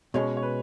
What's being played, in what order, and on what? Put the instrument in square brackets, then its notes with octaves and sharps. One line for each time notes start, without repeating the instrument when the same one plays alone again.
[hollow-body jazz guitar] B2 G#3 C#4 [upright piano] C#5
[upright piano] C#5
B4